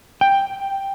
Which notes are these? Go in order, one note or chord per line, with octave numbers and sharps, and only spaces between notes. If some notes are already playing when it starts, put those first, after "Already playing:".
G5